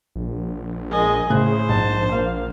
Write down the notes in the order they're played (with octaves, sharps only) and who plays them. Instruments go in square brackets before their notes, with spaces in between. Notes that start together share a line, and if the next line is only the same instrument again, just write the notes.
[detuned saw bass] A#1
[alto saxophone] G#3 [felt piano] A#4 [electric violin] D#5 G#5
[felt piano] A2 F#6 [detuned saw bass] C#3 [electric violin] G#4 [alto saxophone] C5
[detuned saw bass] A#1 [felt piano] G#2 [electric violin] A5
[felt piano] A#3 [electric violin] F5